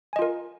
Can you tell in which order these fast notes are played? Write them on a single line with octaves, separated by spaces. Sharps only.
G#5 D#5 F4 A#4